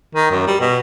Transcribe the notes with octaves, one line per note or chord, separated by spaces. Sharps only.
D#3
F#2
G3
B2